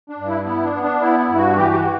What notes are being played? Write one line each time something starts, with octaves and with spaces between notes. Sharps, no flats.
D4
G2
E4
B3 E4
D4
B3
D4
B3 E4
E4
G2
F#4
E3 G4
F#4
E3